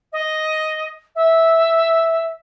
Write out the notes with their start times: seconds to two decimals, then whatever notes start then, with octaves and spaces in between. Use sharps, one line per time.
0.12 D#5
1.15 E5